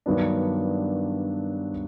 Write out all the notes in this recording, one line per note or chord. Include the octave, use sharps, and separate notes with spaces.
G2 D#3 F#3 B3 D4